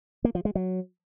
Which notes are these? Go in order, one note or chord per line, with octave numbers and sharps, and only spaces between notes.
A#3
F3
G#3
F#3